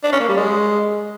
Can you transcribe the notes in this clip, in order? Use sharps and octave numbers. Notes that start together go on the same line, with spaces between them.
D4
C#4
A#3
G3
G#3